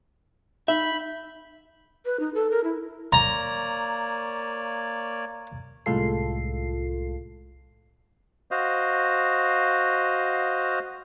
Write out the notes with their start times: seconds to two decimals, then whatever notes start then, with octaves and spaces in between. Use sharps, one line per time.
0.68 D#4 E5 B5 G6
2.05 B4
2.20 D#4
2.34 A4
2.51 A#4
2.64 E4
3.13 A#3 C#5 D5 A#5
5.86 C2 A2 G#3 F4 A4 C7
8.51 F#4 C5 D#5 F5